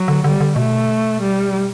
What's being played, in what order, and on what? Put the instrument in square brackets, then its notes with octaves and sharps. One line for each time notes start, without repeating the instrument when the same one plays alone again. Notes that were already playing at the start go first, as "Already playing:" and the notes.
Already playing: [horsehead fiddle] F#3
[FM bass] D3
[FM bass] D3 [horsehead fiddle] G3
[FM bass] D3
[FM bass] B2 [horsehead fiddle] A3
[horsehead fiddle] G3